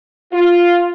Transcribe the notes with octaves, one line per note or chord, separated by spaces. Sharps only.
F4